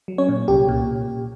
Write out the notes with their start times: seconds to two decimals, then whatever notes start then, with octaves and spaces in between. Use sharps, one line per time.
0.08 F#3
0.18 C#4 C#5
0.29 A#2
0.48 C2 G4
0.69 A#2